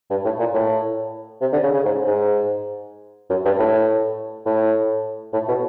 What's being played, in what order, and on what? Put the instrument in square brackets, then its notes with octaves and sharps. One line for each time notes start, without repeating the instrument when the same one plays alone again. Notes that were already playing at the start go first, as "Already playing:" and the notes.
[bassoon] G2
A2
A#2
A2
C3
D3
C#3
C#3
G#2
G#2
F#2
G2
A2
A2
A2
B2